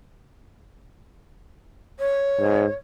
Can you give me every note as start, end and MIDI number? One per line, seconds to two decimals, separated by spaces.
1.99 2.74 73
2.40 2.66 44